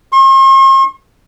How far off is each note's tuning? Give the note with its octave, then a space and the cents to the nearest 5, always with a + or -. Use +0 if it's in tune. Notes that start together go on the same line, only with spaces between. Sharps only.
C6 +45